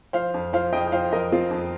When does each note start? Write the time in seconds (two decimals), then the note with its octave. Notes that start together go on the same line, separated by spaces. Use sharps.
0.13 F3 C5 F5
0.34 F2
0.53 F3 C5 F5
0.73 F2 D#5 G5
0.87 G5
0.92 F3 C5 F5
1.12 F2 A#4 D#5
1.32 F3 C4 F4
1.51 F2